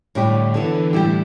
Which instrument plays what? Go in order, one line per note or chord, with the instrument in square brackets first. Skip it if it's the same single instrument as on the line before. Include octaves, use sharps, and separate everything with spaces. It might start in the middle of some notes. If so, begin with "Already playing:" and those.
[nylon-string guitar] A2 G3 D4 G4 [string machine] D3
[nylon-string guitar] D3 B3 E4 [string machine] E3
[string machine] A2 [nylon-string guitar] G3 E4 G4